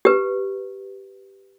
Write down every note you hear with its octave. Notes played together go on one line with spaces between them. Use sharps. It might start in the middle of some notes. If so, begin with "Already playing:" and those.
G4 B4